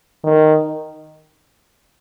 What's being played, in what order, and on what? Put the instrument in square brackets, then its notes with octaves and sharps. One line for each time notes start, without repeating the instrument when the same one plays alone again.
[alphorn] D#3